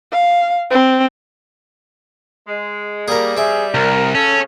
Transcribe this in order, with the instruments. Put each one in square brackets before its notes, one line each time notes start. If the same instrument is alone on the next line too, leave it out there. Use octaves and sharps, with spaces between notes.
[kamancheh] F5
C4
[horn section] G#3
[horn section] G3 [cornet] A#3 [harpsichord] G#4 A#4
[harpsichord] C4 E5 [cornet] G#4
[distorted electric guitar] C2 [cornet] A#4
[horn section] C#3 [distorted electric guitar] C#4 [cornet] A4